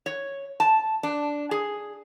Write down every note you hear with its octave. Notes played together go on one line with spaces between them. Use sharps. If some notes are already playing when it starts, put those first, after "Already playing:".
C#5
A5
D4
G#4